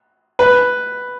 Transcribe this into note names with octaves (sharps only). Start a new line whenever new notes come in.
B4